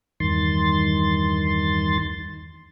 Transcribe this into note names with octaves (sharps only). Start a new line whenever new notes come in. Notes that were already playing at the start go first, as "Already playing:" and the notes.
E2 G2 D#3 C6 A6